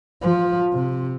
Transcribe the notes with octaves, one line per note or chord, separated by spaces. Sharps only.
F3
C3